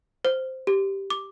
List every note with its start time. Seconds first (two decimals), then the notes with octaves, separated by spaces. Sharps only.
0.25 C5
0.67 G4
1.10 D6